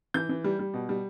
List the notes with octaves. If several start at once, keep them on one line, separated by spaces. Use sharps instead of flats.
E3 G6
E3
G3
G3
B2
G3